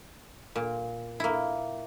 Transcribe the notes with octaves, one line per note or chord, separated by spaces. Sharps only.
A#2
A#3 E4